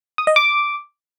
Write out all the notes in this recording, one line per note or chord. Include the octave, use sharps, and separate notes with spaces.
D#6
D#5
D6